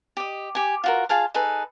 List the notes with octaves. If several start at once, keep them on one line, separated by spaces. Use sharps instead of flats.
G4 D#5
G4 G#5
F4 F#4 A#4
F4 G#4 F5 A5
D#4 G#4 A4 B4